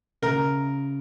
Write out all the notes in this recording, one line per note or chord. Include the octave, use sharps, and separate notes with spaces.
C#3 A#4